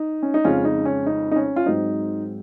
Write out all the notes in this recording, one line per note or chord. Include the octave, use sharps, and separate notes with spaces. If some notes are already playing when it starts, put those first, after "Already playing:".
Already playing: D#4
C#4
D#4
F2 C#3 G#3 C#4 F4
D#4
C#4
D#4
D#4
C#4
F4
G#2 F#3 C4 D#4